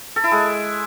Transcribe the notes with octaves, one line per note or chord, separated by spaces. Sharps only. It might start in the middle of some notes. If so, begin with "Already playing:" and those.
A4
E4
G#3